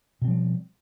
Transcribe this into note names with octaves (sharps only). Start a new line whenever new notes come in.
B2 F3 G3 C4